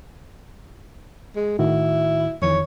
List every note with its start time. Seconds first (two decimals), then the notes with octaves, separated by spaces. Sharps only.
1.36 G#3
1.59 A2 D#3 E4 F#4
2.42 F2 D#3 E3 C#5